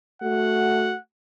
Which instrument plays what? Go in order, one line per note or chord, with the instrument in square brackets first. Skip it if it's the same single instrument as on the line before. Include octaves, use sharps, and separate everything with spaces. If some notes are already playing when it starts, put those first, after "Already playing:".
[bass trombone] A3 [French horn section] F#4 [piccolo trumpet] F#5